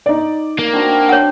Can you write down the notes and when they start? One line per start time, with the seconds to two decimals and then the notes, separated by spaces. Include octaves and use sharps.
0.06 D#4 D5
0.59 A#3
0.73 C4 D4 F#4
1.09 C#5 F#5